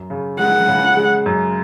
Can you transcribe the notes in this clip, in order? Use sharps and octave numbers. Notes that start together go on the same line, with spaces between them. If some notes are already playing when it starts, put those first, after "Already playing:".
Already playing: F#2
C#3
G#3 F#5
C#3
G#3
F#2